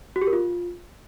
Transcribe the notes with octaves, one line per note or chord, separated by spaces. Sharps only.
F#4
G4
A#4
F4